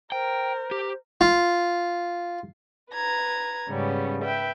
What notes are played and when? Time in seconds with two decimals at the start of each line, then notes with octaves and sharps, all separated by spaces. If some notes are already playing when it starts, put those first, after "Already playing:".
0.12 A#4 C5 G5
0.71 G4
1.21 F4
2.92 B4 A#5 G#6
3.69 G#2 C#3 G3 B3 C#4
4.22 B4 E5 G5